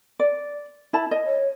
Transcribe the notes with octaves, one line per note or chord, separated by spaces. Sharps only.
D5
E4 A5 B5
D#5
C#5